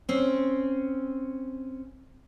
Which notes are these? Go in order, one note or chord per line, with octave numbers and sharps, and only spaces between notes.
C4 C#4